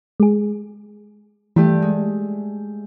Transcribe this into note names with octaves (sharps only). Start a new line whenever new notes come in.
G#3 G#4
G2 E3 A3 G4
G#3